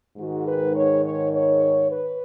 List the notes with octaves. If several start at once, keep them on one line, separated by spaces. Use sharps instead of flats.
G#2 D#3 F#4
B4
C#5
C#5
C#5
B4